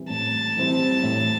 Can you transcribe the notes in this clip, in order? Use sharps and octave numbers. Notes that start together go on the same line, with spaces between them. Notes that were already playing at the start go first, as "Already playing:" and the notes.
Already playing: E3 G3 C4 E4
A2 A5
E3 G3 C4 E4
A2